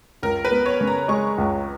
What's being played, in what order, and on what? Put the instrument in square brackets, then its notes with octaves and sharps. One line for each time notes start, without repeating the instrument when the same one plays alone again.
[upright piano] C#2 [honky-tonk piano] A#4
[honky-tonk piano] B4
[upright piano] B3
[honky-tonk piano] C#5
[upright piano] C#3
[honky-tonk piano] A#5
[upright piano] G#3 [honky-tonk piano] C#6
[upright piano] C#2